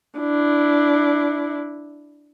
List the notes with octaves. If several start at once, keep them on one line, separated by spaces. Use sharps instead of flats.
D4 E4